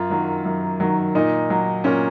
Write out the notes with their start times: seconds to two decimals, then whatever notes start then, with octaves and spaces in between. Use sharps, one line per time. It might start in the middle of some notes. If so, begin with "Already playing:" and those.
Already playing: F#2 F4
0.10 D#3 F#3
0.45 F#2
0.80 D#3 F#3
1.15 A#2 D#4
1.50 F#3
1.84 A#2 C#4